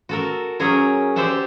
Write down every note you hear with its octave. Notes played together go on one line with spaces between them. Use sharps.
F#4 A4 A#4
F#3 C#4 G#4 A#4 C#5
G4 C5 D5 E5 F#5 A5